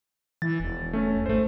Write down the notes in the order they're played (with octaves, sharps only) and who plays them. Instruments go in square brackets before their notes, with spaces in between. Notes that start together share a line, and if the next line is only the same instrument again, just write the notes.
[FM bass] E3 [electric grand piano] A6
[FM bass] E1
[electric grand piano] A3 C#4
[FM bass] G#1 [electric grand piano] A3 C5